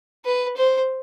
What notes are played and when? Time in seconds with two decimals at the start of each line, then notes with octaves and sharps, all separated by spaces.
0.25 B4
0.57 C5